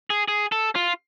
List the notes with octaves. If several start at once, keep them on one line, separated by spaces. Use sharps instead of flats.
G#4
G#4
A4
F4